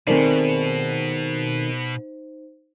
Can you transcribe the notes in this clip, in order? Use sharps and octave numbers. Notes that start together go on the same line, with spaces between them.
B2 D#3 A3 C4 D#4 G#4 C5 D5